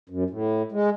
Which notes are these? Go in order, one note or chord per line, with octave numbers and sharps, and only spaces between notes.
F#2
A2
G#3